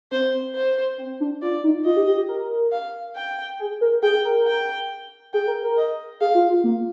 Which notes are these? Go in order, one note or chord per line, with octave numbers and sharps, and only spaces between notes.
C4 C5
C5
C4
D4
F4 D5
D#4
F4 D#5
G4
G4
G4
A#4
F5
G5
G#4
A#4
G#4 G5
A#4
G5
G#4 G5
A#4
A#4
D#5
G#4 F5
F4
F4
A#3